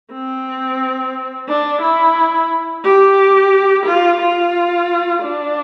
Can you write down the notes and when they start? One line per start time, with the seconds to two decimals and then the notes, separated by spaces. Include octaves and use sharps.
0.12 C4
1.48 D4
1.82 E4
2.84 G4
3.86 F4
4.21 F4
5.23 D4